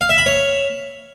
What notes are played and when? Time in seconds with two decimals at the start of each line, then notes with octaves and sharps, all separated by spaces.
0.01 F5
0.09 E5
0.18 B5
0.26 C#5